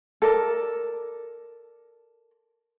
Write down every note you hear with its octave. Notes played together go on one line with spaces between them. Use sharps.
A4 A#4 D5